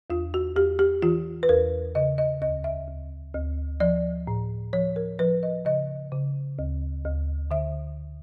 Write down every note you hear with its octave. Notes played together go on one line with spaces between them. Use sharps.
E2 F4
F#4
E2 G4
G4
E3 F4
B4
E2 A#4
C#3 D#5
D#5
D2 D#5
E5
D2
D2
F3 D5
A2
F3 C#5
A#4
F3 B4
D#5
C#3 D#5
C#3
D2
D2
D3 E5